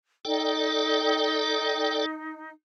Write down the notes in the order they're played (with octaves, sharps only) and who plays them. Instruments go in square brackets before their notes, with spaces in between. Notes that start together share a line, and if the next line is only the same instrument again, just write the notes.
[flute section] D#4 [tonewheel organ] A4 D5 G5